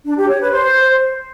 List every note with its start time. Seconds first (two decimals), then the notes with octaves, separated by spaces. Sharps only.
0.05 D4
0.17 G4
0.28 C#5
0.40 B4
0.52 C5